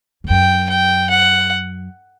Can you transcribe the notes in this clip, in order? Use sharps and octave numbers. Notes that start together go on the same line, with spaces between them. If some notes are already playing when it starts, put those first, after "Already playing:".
E2
F#2 G5
G5
F#5